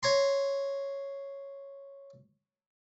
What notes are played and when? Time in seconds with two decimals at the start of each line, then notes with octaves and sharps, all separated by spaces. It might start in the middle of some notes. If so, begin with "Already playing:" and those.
0.03 C#5 A#5 C6